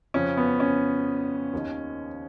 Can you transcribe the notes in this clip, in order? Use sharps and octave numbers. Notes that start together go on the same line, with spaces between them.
F2 C#3 C#4
B3
C#4
D#2 D#3